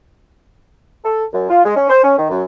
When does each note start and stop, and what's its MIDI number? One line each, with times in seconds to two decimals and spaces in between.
1.04 1.23 69
1.33 1.47 42
1.50 1.61 65
1.65 1.74 56
1.76 1.87 61
1.90 2.00 72
2.04 2.14 61
2.18 2.28 51
2.30 2.43 42